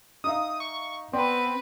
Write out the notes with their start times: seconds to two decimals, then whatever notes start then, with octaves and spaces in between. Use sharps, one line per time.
0.24 D#4 E5 F5 D#6
0.60 C#6
1.13 B3 C4 B4 D5